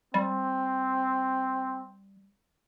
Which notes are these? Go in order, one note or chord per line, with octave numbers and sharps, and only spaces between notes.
G3 C4